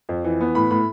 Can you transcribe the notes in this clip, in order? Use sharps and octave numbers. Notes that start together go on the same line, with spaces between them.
F2
E3
B3
A2 B5
A2 B5